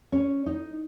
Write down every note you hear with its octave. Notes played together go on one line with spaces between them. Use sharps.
C#4
D#4